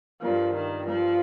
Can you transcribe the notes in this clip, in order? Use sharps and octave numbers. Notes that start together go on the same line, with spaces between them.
G2 F3 G3 A#3
D#3
G2 F3 G3 A#3